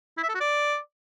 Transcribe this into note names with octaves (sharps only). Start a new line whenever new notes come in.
E4
E5
A4
F#4
D5